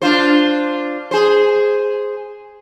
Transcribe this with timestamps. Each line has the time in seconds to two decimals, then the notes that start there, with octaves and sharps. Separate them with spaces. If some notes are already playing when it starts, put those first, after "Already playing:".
0.02 D4 F4 C5
1.11 G#4 C5